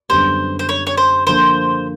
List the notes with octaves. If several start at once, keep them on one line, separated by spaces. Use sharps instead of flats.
F#2 D3 G3 B3 C5
C5
C#5
C#5
C5
D3 F3 A#3 C5